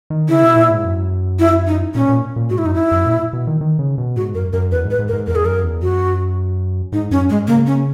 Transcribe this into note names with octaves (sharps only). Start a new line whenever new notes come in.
D#3
C#3 E4
B2
A#2
G#2
F#2
E4
D#4
A#2 C#4
A#2
A#2
G#2 F#4
E4
F#2 D#4
E4
F#2
A#2
B2
D#3
D#3
C#3
B2
G#2 F#4
F#2 A#4
F#2 A#4
E2 B4
G#2
B4
G#2
A#4
G#2
E2 A#4
G#4
F#2 A#4
E2
F#2 F#4
G#2 D#4
F#2 C#4
G#2 G#3
C#3 A#3
C#4